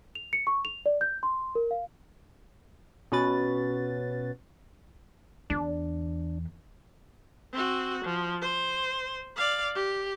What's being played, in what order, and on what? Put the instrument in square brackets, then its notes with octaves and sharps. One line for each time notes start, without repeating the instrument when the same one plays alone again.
[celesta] F7
C#7
C#6
F7
D5
G6
C6
A#4
F5
[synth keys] B2 C#4 F#4 B4 A6
[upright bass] E2 [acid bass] D4
[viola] C4 F#4
F3
C5
D5 F5
G4